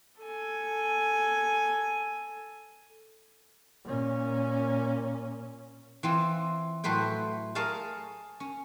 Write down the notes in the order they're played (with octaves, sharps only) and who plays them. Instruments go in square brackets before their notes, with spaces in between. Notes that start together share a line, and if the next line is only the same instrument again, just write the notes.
[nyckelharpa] A4 G#5
[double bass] A#2 C#4
[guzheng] E3 C4 F4
A2 F#3 A3 B4 C5 G5
G#4 A#4 C#5 F5 G#5 A5
C#4